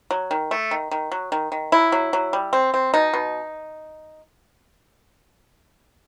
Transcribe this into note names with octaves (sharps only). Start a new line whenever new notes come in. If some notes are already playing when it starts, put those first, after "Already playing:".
F#3
D#3
A3
D#3
D#3
F#3
D#3
D#3
F#3 E4
F#3
F#3
G3
C4
C4
B2 D#4
B2